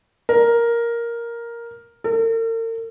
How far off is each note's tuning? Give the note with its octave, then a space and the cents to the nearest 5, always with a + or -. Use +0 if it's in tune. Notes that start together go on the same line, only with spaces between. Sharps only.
A#4 +5
A#4 -45